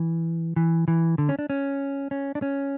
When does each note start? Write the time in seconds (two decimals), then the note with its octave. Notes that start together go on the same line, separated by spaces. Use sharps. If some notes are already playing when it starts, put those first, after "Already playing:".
Already playing: E3
0.56 E3
0.88 E3
1.18 D3
1.29 C#4
1.39 D4
1.50 C#4
2.11 C#4
2.35 D4
2.42 C#4